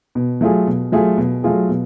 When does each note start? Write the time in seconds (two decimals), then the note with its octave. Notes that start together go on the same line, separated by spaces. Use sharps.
0.15 B2
0.41 F#3 A3 F4 G#4
0.67 B2
0.92 F#3 A3 F4 G#4
1.18 B2
1.43 F#3 A3 F4 G#4
1.69 B2